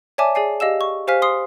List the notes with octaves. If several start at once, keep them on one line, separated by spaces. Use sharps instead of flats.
C#5 D5 E5 G#5 A5 D6
G#4 D5 G#5 C7
G4 D#5 F5 E6 E7
C#6
G4 C5 F5 G#5 F6 B6
C6 D#6 C7